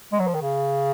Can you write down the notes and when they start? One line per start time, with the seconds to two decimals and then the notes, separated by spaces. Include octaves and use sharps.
0.12 G#3
0.19 F#3
0.27 F3
0.34 D#3
0.42 C#3